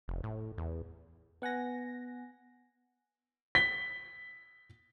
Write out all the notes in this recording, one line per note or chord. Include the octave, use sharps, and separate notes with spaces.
F1
A2
E2
B3 F#5 G#5 A#6
B6 G7